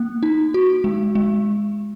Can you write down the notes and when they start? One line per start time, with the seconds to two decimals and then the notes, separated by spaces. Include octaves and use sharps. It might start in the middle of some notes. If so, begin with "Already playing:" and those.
Already playing: A#3
0.23 D#4
0.54 F#4
0.84 G#3
1.15 G#3